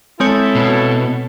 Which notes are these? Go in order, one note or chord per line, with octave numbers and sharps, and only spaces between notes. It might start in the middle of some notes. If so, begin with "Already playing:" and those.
G#3 C4 E4 A4 C#5
B2